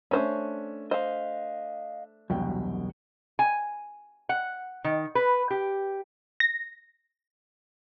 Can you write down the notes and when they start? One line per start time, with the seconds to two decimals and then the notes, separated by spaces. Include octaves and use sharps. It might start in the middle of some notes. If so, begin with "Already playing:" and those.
0.11 A3 C#4 D4 C5 E5
0.91 C5 D#5 F5
2.30 E1 C2 F#2 B2 G5
3.39 G#5
4.29 F#5
4.84 D#3
5.15 B4
5.50 G4
6.40 A#6